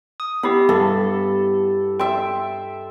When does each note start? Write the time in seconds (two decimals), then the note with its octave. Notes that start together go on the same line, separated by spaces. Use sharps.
0.20 D#6
0.43 B3 E4 G4 B5
0.69 G2 A4
2.00 E5 G5 C6